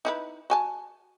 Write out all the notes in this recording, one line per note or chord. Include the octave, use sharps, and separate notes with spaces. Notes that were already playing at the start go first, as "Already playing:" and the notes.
D#4 E4 B4
F#4 G#5 A5